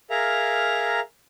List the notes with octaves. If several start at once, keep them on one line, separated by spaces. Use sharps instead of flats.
G#4 A#4 E5 F5 A#5